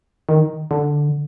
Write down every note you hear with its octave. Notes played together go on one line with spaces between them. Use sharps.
D#3
D3